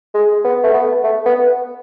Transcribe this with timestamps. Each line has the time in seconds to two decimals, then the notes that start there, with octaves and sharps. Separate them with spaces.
0.14 G#3
0.45 B3
0.64 A3
0.74 B3
1.04 A3
1.26 B3